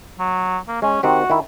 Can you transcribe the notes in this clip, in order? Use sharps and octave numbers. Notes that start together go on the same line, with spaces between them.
F#3
A#3
G#3 C#4
D#3 C4 F#4 G4
D#3 E4